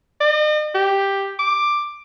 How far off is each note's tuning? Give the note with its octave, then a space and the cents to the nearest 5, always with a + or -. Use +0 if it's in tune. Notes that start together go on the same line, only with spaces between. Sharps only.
D#5 -45
G4 +5
D6 +5